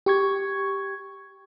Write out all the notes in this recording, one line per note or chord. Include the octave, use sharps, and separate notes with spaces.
G4 C#6 G#6